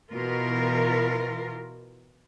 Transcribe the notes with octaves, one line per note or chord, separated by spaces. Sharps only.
B2 E3 F4 A#4